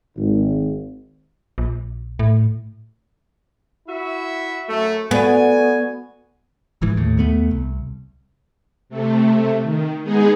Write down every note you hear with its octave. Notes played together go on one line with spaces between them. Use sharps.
G#1
A#1
A2
E4 F#4 E5
F#2 A3
B3 F#4 A4 D5 G#5
G1 G#2 E3
D#2 A2
D#2 A3 B3
C2
C3 A3
D#3
G#3 B3 D#4 G#4